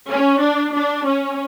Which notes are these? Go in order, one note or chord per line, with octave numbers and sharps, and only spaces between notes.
C#4
D4
D4
C#4